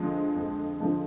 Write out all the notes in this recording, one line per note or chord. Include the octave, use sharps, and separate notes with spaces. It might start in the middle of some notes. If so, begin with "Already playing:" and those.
Already playing: F2 D3 F3 G#3
F2
D3 F3 G#3